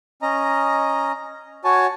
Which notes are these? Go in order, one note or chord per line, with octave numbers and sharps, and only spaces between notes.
C#4 D#5 A#5
F#4 C#5 G#5 A5